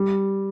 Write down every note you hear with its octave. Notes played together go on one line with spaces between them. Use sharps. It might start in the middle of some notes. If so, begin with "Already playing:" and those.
Already playing: G3